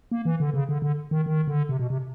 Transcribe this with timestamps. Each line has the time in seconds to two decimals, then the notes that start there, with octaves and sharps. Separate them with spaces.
0.12 A#3
0.25 E3
0.40 D3
0.54 C#3
0.69 D3
0.82 D3
1.11 D#3
1.26 D#3
1.48 D3
1.69 C3
1.80 B2
1.90 C3